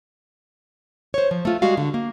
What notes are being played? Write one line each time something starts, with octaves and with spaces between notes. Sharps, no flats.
C5 C#5
F3
A3 F4
G3 G#3 F#4 F5
D3
A#3